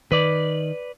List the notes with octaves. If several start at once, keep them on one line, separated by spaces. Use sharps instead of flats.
D#3 B4 D5